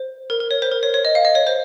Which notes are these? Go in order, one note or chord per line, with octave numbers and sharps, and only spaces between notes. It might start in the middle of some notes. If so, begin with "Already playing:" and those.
Already playing: C5
A#4
A#4
C#5
C5
A#4
C#5
C#5
D#5
F5
D#5
C#5
C5